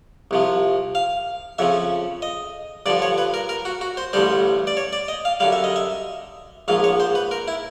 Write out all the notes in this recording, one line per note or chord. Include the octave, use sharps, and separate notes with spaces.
C2 C3 F3
F5
F2 C#3 F3 E5
D#5
G2 D3 F3 D5
C#5
B4
A#4
A#4
F#4
F#4
C5
A1 G2 D3 G3 C5
D5
C#5
D5
D#5
F5
F#2 D3 G3 F5
E5
D#5
E5
A#1 G#2 F3 F5
C#5
C5
B4
A#4
E4